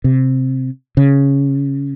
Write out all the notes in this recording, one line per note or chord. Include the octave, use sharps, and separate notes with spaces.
C3
C#3